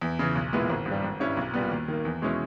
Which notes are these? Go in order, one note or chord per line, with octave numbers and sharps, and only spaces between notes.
E2
C#3 E3
B1
A#2 G#3 B3 E4
G#1
G2
G3
G#1
G2 G3 C#4 E4
B1
A#2 G3 B3
D#2
D#3 A#3
E2
B2 G#3 C#4 E4